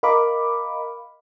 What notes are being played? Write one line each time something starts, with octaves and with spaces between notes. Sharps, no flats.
A#4 D#5 F5 B5 D6